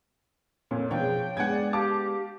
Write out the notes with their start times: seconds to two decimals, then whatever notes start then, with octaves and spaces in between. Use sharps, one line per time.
0.71 F2 A#2 C#4
0.91 B2 F3 B3 D4 G#4 C#5 G5
1.37 G#3 B3 D4 F#5 G#5 G#6
1.50 D5
1.73 G4 F5 A5 D6